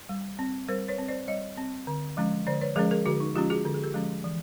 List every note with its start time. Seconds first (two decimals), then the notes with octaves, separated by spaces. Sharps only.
0.09 G3
0.39 C4
0.68 G3 A#4 C5
0.88 B4 C#5
0.98 C4
1.08 C5 D5
1.28 G3 C#5 D#5
1.57 C4
1.87 D3
2.17 F3 G#3 C#4
2.47 D3 C5 D5
2.61 B4 C#5
2.76 F3 G#3 C#4 G#4 A#4
2.91 G#4 A#4
3.06 D3 F#4 G#4
3.20 D#4
3.35 F3 G#3 C#4 F4 G4
3.50 F#4 G#4
3.65 D3 A4
3.74 G#4
3.83 G4 A4
3.94 F3 G#3 C#4
4.24 E3